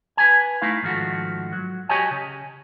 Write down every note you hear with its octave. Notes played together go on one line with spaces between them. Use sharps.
B4 G#5
A3 D#4 E4 F5
G#2 D#3 F3 A3 F#4
F#3
F#4 G4 C#5 D#5 G#5
C#3